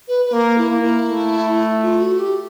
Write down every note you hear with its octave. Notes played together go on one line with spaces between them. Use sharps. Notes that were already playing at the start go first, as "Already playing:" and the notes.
B4
B4
A#3 A#4
E4
A#3
E4
A3
F4
F#4
G4